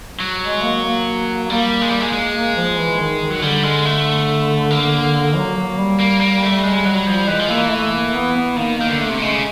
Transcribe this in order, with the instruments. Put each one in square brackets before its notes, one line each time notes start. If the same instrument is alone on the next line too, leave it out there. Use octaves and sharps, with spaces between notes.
[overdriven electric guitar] F#3
[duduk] G#3
A#3
A#3
[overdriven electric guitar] G3 [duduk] A#3
[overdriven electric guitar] G#3
G3
G#3
G#3
[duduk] A#3
F3
E3
D#3
D#3
[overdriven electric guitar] F#3
[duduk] D3 [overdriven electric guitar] G3
[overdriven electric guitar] G#3
A3
A#3
[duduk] F#3
F#3
G3
[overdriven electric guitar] A#3
A#3
A3
G#3
F#3
F3
[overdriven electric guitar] E3 [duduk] G#3
[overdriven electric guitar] F3
[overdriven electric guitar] E3 [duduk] A#3
[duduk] A3
A#3
B3
B3
[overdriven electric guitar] D#3 [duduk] A#3
[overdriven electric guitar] D#3 [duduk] A#3
[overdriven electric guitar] D3
[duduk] A3
[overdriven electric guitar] C3
[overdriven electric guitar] C#3 [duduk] G#3